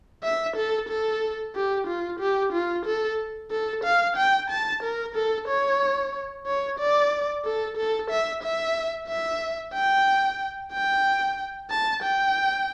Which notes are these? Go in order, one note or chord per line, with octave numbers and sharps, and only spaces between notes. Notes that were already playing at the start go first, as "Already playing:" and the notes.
E5
A4
A4
G4
F4
G4
F4
A4
A4
F5
G5
A5
A#4
A4
C#5
C#5
D5
A4
A4
E5
E5
E5
G5
G5
A5
G5